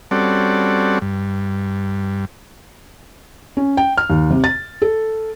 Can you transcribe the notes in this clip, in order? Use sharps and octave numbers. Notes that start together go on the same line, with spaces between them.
G3 C4 C#4 F#4 A4 D5
G2
C#4
G5
F6
D#2
C3
A6
A4